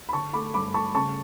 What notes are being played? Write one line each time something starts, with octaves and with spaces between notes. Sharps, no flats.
B5
D3 A5 C#6
A3 B5 D6
G2 B5 D6
A3 A5 C#6
C#3 A5 C#6